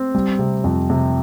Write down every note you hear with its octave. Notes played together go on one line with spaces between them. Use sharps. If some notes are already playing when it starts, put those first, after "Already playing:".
Already playing: C4
G3
C3
F2
C3